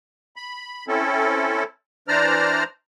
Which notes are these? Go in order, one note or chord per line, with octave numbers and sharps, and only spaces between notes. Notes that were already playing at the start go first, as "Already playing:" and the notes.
B5
C4 C#4 E4 A4
E3 D4 C5 D5 A#5 F6